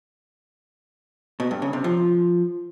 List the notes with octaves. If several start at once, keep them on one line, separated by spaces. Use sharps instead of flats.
B2
G2
C#3
C3
F3